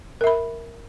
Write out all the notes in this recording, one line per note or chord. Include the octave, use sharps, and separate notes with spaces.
A#4 E5 B5